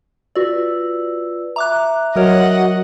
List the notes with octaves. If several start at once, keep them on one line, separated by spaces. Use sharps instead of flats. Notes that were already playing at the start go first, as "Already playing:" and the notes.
F4 F#4 B4 D5 E6
E5 A#5 D6 F#6
F#3 F#4 A#4 C#5 D#5 F#5